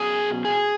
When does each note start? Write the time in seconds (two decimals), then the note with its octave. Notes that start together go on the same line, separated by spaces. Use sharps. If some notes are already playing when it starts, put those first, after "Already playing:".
Already playing: B2 F#3 C#4 G#4
0.45 G#4